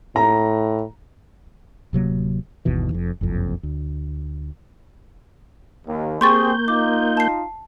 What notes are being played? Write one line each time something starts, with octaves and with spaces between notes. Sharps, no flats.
A2 A#5
D1 C3 F#3 A#3
G1 D#2 B2 E3
F1 F2
F#1 C2 F2
D2
D#2
A#3 C4 G4 G#4 C6 C#6 G6 A6
D#4 F4 D6
A5 C7